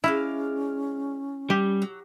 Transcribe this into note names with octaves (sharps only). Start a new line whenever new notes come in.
G#3 C#4 E4 D5 F5
G3 G4
F#3